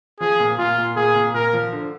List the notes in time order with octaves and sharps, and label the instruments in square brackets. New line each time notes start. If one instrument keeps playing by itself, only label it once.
[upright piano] F3 [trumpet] G#4
[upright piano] A#2
[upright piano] A#2 [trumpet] F4
[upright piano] A#2
[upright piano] A#2 [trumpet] G#4
[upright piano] A#2
[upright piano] A#2 [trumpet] A#4
[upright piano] F3
D3